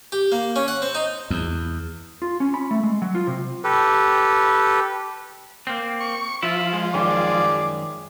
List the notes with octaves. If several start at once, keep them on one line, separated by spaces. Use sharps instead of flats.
G4
A#3
C#4
F#5
C4
D#4
E2
F4
C#4
B5
A3
G#3
F#3
F4
C3
G4 A4 B4
A#3 C4
C#6
F3 E4 F4
G#3
F#2 D#3 G#3 G#4 D5